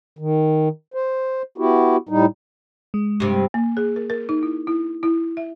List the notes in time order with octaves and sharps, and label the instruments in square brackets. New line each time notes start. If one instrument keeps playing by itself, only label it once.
[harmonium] D#3
C5
B3 E4 F#4 G4
A2 G3 D#4
[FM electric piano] G#3
[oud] G2 C3
[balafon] A#3
G#4
A#4
A#4
D#4
E4
E4
E4
E5